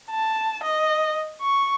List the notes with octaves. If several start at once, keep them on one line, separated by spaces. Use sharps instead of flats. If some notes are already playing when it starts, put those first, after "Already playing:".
A5
D#5
C#6